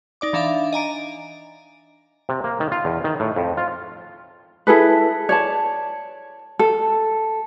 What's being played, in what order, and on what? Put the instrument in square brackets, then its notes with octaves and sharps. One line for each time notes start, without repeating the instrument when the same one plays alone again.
[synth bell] D#4 D5 D6
E3 D4 E5 F5 D6
D#5 G#5 A#5 D7
[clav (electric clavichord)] C3
A#3
D#3
F4
E2
D#3
A2
F2
F4
[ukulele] E4 G#4 A4 B4
C#5 D5 A5
A4